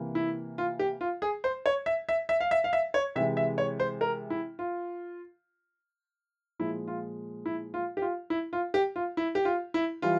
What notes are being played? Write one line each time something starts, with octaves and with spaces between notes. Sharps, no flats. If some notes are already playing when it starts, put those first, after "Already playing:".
Already playing: C3 E3 A#3
E4
F4
G4
F4
G#4
C5
C#5
E5
E5
E5
F5
E5
F5
E5
C#5
C3 E3 G#3 E5
E5
C#5
C5
A#4
E4
F4
A#2 F3 G#3 E4
F4
E4
F4
G4
F4
E4
F4
G4
F4
E4
G4
F4
E4
E3 G3 F4